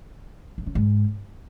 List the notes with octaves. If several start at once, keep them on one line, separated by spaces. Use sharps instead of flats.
G2
C#3
G#2